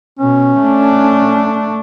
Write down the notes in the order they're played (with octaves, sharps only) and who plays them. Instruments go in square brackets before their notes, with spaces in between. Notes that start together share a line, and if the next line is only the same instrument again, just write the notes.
[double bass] B2 [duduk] C#4
[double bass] A3 D4